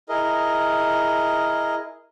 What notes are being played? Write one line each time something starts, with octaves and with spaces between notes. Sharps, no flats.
E4 G#4 A#4 D#5